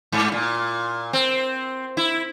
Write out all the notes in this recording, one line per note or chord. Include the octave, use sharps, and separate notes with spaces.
G#2
A#2
C4
E4